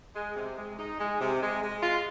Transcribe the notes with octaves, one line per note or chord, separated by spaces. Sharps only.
G#3
C3
G#3
D#4
G#3
C3
G#3
G#3
F4